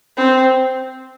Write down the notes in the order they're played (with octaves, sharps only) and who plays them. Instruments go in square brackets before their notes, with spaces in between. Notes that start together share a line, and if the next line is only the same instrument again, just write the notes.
[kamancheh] C4